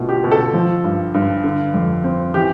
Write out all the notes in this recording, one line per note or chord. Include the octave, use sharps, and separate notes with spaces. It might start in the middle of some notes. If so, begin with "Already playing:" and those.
Already playing: B2 A3 F4
G4
B2
A4
F3
G2
G2
D3
F2
C4
E3 G4